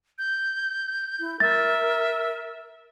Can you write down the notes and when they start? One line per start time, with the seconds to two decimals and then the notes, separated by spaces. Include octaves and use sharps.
0.18 G6
1.20 E4
1.40 A#4 E5 A6